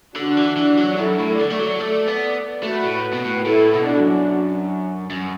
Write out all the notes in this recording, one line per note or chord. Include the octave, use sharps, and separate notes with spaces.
D3 D4 F#4
E3
E3
F#3
F#2 E4 A4
A2
D3 A4 D5
A3
F#3
A3
B3
A3 F#4 B4
A2
B2
A2
A2 E4 A4
B2
D4 F#4
F#2
F#2